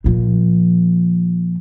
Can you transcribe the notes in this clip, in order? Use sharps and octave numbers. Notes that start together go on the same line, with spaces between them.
A#2 F3